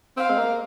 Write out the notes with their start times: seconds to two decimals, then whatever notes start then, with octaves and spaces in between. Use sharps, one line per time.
0.17 C4 F5
0.30 G#3
0.38 A#3